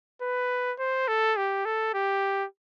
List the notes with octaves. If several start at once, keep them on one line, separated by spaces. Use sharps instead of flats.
B4
C5
A4
G4
A4
G4